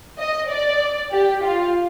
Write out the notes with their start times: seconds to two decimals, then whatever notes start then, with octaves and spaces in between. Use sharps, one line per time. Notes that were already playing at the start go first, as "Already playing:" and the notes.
0.18 D#5
0.50 D5
1.12 G4
1.43 F4